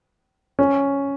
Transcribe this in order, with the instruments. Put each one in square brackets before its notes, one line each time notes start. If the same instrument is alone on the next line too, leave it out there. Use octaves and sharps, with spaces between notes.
[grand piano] C#4